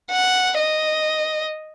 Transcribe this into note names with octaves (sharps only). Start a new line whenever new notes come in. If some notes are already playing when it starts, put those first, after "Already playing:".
F#5
D#5